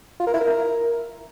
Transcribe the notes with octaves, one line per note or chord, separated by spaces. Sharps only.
F4
A#4
E4
A#4